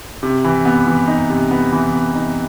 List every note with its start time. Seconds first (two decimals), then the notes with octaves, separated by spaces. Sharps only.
0.23 C3
0.44 E3
0.65 B3
0.87 E3
1.07 D#4
1.30 C3
1.51 B3
1.72 E3
1.94 B3
2.15 D#4